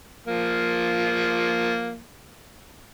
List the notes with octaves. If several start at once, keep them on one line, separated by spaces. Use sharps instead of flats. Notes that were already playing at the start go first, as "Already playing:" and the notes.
F3 A#3